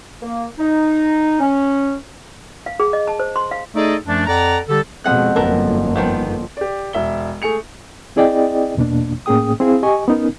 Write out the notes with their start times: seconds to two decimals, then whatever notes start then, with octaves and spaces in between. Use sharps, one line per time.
0.22 A#3
0.58 D#4
1.40 C#4
2.66 F5
2.80 G#4
2.93 D#5
3.07 A5
3.20 C5
3.36 C6
3.51 F5
3.75 A3 D#4 G#4 A4 D5 D#5
4.06 F#2 F3 A3 D4
4.27 F2 A4 D5 F#5 A#5
4.69 D3 G3 G4 A4
5.04 F2 B2 G#3 F#5 F#6
5.36 G1 F#2 A#3 B3 A4 A#4
5.96 D#3 F3 B3
6.57 G4 D5
6.93 E1 E5 G7
7.42 A3 G#4 C#7 F7
8.16 C4 E4 G#4 D5 D#5 G5
8.77 E2 B2 A#3 D4
9.26 A2 A#3 C#4 G#4 G5 D#6
9.60 C4 E4 G#4 F5
9.83 G4 D#5 G#5 C#6
10.08 B3 C#4 D#4 A#4